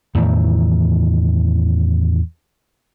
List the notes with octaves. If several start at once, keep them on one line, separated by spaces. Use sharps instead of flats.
E2 A2 D#3 E3